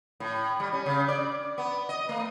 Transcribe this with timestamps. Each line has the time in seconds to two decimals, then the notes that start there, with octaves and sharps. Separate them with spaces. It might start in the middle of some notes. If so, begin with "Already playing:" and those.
0.20 A2
0.60 G3
0.73 C#4
0.86 C#3
1.08 D5
1.58 B3
1.89 D#5
2.09 A3